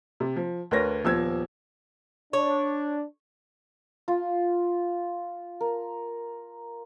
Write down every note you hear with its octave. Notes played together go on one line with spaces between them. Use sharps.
C3
F3
D2 A#4 B4 C#5 A#6
D#1 F3 B3 E6 G#6
D4 C#5
F4
A#4